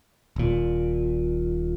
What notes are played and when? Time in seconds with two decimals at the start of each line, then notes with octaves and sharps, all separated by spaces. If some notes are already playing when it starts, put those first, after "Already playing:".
0.36 D#1 A#2